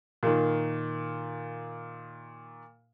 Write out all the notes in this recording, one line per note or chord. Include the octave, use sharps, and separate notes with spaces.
A#2 D#3